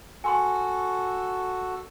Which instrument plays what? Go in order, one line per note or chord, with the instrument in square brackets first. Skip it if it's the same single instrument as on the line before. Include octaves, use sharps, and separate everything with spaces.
[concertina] F#4 A4 [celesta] G#5 C6 C#6